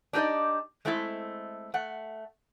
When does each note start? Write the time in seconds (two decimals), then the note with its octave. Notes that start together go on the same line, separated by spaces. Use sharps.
0.13 D4 D#4 G4 A#4 D5 D#5
0.85 G#3 A3 C4 E4 A4
1.74 A3 F#5